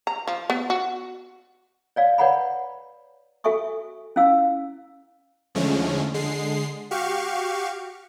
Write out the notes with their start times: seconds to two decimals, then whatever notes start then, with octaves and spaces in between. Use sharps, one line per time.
0.07 A#5
0.27 F3
0.50 B3
0.70 F#4
1.96 C#5 D5 F5
2.18 B4 C#5 D5 F#5 A#5 B5
3.44 F#4 A4 E5 G#5 C#6 D#6
4.16 C#4 E4 F5 E6
5.55 E2 D3 F3 G#3 A3 C#4
6.14 D3 G#3 C7
6.91 F#4 G4 F5 C#6